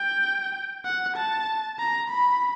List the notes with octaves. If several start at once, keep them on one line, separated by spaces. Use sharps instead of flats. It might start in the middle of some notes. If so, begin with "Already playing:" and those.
Already playing: G5
F#5
A5
A#5
B5